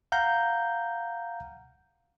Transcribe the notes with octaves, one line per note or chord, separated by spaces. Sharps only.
F5 F#5 A#5 G6